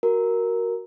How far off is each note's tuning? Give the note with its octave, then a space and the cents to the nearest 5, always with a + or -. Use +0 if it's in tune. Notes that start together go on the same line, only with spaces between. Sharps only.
F#4 +0 A#4 +0